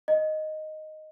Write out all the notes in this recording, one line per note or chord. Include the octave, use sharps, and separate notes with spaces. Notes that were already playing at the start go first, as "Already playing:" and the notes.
D#5